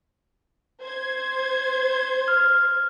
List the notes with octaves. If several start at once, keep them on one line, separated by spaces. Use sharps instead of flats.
C5 G#6
F6